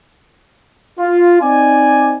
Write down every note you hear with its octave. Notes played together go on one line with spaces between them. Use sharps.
F4
C4 D#4 D5 G#5